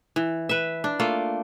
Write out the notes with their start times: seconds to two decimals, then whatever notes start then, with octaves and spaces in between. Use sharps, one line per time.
0.16 E3
0.49 B4 E5
0.84 D4
0.99 A3 A#3 F4